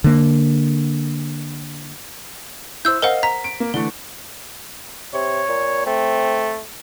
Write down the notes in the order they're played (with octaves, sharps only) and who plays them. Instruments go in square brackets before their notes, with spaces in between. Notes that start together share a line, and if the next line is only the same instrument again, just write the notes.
[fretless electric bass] D3 A#3
[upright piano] E4 C5 [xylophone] E6 G6
[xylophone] A#4 C5 F#5 [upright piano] D#5 F5
[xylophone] A#5 [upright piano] B6
[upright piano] D7
A#3
[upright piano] D3 E3 A3 [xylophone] G7
[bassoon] C3 [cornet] C#5
[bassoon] A#2
[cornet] A3 [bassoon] C4